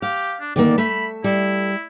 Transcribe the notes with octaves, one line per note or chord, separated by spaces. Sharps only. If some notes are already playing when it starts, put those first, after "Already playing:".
G4 F5
D4
D3 D#3 A#3 D5
A3 E5 B5
G3 E4